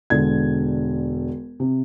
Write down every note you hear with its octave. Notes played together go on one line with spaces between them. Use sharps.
E1 D3 G#6
C3